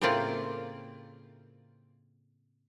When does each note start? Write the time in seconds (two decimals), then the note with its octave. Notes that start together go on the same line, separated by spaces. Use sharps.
0.01 A2 C#3 A#3 C4 F4 D5